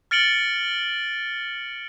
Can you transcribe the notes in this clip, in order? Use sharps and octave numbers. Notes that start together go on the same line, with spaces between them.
F6 A6 C#7 D7 F#7 G7